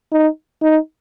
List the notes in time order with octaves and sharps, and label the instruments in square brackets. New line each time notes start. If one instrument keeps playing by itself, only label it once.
[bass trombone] D#4
D#4